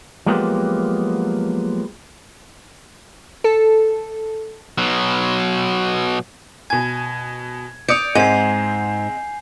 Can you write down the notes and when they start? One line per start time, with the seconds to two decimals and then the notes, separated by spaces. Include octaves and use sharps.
0.26 F3 F#3 G#3 A#3 B3 G4
3.44 A4
4.78 B2 F#3
6.70 B2 G#5 G#6
7.88 D5 D#6 G6 C#7 F7
8.15 G#2 G#3 C4 G#5 C7